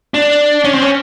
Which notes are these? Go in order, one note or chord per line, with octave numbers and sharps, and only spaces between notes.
D4
C#4
C4
C#4